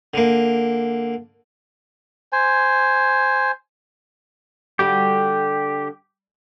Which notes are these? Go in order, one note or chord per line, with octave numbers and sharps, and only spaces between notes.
D3 A#3
C5 G#5
D3 G3 F#4 G4